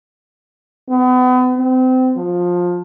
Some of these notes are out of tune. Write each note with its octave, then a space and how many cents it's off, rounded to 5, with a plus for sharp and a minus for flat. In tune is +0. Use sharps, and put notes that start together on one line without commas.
B3 +35
C4 -30
F3 +20